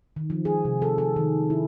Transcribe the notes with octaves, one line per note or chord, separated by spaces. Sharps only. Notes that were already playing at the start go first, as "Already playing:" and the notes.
D#3
F3
G#4
C3
A4
A4
D#3
E4